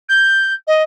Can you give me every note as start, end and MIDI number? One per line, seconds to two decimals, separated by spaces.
0.09 0.53 91
0.67 0.83 75